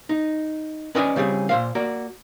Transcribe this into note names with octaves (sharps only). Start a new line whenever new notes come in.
D#4
C#4 B4 D5 D#5 F#5 G#5
C#3 G3 C4 G#4
A#2 C5 F5
A#3 F#4 D5